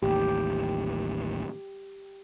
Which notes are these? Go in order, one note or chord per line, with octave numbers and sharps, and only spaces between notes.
A1 D#2 G4